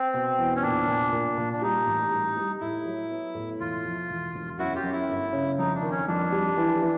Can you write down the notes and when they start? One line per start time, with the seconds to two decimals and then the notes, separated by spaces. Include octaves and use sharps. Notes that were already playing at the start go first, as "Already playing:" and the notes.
Already playing: C4
0.14 B2
0.39 E2
0.56 C#4
0.63 A#2 D4
0.88 A#2
1.12 A#2
1.38 A#2
1.53 D4
1.62 G3 D#4
1.87 A1
2.12 G3
2.37 G3
2.61 A2 E4
2.85 F#3
3.11 B3
3.35 A2
3.60 E1 F4
3.85 F3
4.10 E1
4.35 E1
4.59 F#2 E4 F#4
4.75 F4 G4
4.83 F#2
4.92 E4
5.08 G1
5.33 C#3
5.59 F2 D#4
5.75 D4
5.82 D#3
5.91 C#4
6.08 F2 D4
6.32 G3
6.57 E3
6.82 E3